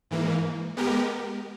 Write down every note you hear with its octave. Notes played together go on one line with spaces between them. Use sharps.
G#2 E3 A#3
G#3 B3 G4 A#4